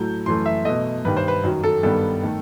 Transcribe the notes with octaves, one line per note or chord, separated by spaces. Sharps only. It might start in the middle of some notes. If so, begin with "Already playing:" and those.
Already playing: A2 F#3 A3 G6
F#2 E3 A3 C6
E5
B2 A3 D#5
G2 D#3 G3 B4
C5
B4
F#2 D#3 F#3
A4
G2 D#3 G3 B3 A4
D#3 A3